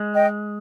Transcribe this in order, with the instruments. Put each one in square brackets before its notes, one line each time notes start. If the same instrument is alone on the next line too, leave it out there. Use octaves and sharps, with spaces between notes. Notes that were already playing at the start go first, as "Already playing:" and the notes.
Already playing: [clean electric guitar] G#3
[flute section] D#5 G5